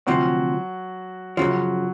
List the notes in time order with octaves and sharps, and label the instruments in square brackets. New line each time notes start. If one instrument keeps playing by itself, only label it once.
[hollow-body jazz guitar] D2 C3 F3 [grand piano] F#3 F#4
[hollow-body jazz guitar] F#2 C#3 F3 [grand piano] F#3 F#4